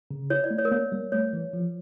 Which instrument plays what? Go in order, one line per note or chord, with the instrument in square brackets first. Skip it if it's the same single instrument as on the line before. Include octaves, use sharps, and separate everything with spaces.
[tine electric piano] C#3
[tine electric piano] E4 [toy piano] C#5
[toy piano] D5
[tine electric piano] A3
[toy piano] C#5
A#4
[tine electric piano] A#3 [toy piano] C#5
[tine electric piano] G3
[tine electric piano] A3 [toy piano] C#5
[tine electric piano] E3
F3